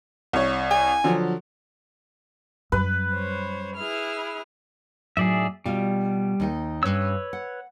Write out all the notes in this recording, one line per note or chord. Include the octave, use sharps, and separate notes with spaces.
C2 C#5
G#5
D3 F3 F#3
F#2 G3 B4
C5 C#5
E4 G#4 F6
A2 F#3 D#4 G#4 D5 E5
B2 G3 F4
D#2 D#4 G5
G2 C#4 B4 C#5 E6
F#5